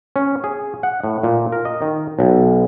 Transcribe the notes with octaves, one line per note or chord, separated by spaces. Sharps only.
C#4
G#4
F#5
A2
A#2
A#4
D#5
D#3
B1